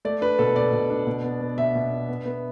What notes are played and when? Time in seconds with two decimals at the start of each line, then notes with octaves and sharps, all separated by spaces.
0.05 A3 D5
0.22 D4 B4
0.39 B2 A4
0.56 B2 D5
0.72 B2
0.90 D4
1.07 B2
1.24 B3
1.41 B3
1.58 B2 E5
1.75 B2
1.92 D4
2.09 B3
2.25 B3